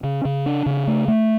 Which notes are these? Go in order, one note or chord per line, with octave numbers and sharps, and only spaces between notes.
C#3
C#3
D4
C#3
A3
A3